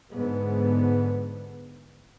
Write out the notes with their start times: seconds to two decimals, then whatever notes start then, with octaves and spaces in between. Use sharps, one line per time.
0.12 G#2 D3 B3